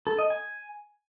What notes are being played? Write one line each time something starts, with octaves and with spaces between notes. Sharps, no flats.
A4
D#5
G#5